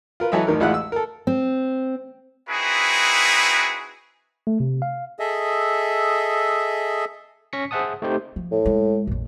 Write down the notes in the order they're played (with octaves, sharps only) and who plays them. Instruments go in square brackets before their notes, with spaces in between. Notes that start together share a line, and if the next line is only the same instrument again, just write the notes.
[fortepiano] F4 A#4 B4
E3 F#3 A4 D#5 E5
A1 D#3 A#4
A1 G#3 E4 F4 F#5 F#6
E6
A4 A#4
[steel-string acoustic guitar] C4
[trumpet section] C4 D#4 E4 F#4 G#4 B4
[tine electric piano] A3
C3
F5
[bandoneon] G#4 A4 D#5 E5
[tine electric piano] C#4 C#6 A#6 B6 C#7
G#4 C5 E5 F#5 A5 D#6
A3 C4 D#4 G4 C5
[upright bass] F3
[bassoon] A2
[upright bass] G#3
A#1 F2